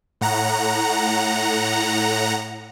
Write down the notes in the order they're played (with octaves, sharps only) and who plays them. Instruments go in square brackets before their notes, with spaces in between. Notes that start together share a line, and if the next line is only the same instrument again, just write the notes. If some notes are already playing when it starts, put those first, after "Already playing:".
[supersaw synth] A2 F#5 A#5